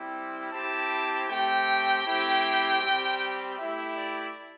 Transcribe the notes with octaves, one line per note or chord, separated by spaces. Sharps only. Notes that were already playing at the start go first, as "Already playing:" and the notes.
Already playing: G3 C4 E4 G4
C4 E4 G4 A5
A3 C4 G4 G5
A3 C4 E4 G4
G3 C4 G4
A3 E4 G4 E5
D5